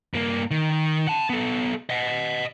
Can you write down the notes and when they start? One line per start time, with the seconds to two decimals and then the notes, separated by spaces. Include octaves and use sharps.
0.14 G2 A#3
0.51 D#3
1.07 F#5 A5
1.30 B3 A4
1.90 D#5 F#5